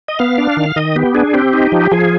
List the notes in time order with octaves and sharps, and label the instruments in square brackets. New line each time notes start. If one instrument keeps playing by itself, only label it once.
[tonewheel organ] D#5
B3 F5
D4
D#3
D#3 D#5
B3 G4
D4 G#4
C4 G4
D#4
F3
F3 G#4